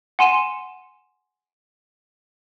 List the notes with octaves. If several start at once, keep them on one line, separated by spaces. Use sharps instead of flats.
F#5 G#5 C6 D#7 E7